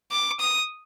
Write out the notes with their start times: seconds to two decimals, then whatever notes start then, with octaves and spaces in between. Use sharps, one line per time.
0.11 D6
0.40 D#6